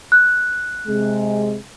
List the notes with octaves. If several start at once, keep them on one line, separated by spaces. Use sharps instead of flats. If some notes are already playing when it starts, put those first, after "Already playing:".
F#6
C3 G#3